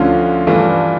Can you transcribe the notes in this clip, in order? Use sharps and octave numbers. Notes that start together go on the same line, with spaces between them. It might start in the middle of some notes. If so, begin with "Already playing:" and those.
Already playing: D2 D3 F3 C#4 F4
G2 E3 A3 D4 F4